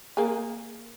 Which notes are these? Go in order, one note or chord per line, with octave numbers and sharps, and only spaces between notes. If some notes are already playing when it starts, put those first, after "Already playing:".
A#3 G#4